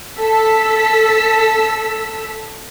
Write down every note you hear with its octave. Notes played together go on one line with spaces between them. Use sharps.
A4 E6 B6